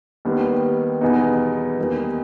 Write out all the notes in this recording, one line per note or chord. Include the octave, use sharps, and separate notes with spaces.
D#2 D#3 G3 B3
E2 B2 G3 B3 D#4
E2 D#3 G3 A#3 D#4